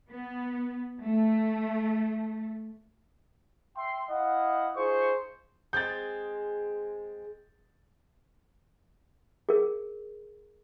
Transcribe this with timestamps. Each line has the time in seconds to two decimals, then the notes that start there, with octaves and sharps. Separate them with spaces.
0.10 B3
1.03 A3
3.77 E5 G5 C6
4.10 E4 D#5 F5 F#5
4.76 D#4 F4 G#4 C5 C#6
5.73 G#3 C4 G#4 G6 A6
9.49 G#4 A#4